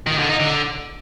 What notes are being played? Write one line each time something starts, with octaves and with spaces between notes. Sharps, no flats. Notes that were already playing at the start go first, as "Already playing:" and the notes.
D#3
D3
D#4
D3